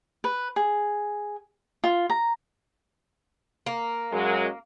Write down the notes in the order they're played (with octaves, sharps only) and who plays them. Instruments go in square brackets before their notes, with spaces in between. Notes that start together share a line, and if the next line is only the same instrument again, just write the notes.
[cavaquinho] B4
G#4
F4
A#5
[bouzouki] A#3
[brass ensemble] F#2 F#3 G#3